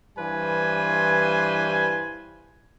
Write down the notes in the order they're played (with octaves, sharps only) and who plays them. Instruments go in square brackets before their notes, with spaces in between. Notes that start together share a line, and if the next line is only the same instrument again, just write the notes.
[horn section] G2 E3 G3 B4 C5 G#5